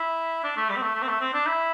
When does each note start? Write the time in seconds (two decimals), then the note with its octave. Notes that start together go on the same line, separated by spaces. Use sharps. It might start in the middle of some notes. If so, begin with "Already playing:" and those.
Already playing: E4
0.44 D4
0.57 A3
0.69 G3
0.77 C4
0.82 A3
0.95 A3
1.02 C4
1.08 A3
1.21 C4
1.33 D4
1.46 E4